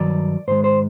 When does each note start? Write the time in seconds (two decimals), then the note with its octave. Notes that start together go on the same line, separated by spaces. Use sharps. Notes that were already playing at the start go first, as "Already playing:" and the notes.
Already playing: G2 D#3 F#3 D5
0.48 G#2 D#3 G#3 C5
0.64 C5